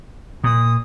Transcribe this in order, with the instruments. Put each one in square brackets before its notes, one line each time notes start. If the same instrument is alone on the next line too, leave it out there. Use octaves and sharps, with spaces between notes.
[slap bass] A#2 [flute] D#6